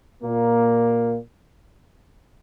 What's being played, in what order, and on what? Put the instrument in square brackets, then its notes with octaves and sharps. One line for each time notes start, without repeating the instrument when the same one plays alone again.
[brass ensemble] A#2 A#3